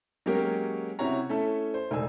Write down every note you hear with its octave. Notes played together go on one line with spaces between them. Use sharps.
F#3 G#3 A#3 C#4 G4 A#4
C3 C#4 E4 F#4 C#5 A#5
A3 C#4 E4 A4
C5
E1 A3 D#4 G#5 E6